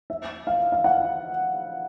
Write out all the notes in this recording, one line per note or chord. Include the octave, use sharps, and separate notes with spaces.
E5
F5
F5
F#5